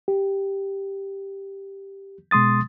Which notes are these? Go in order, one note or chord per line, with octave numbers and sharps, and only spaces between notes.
G4
B2 G#3 C6 D#6 A6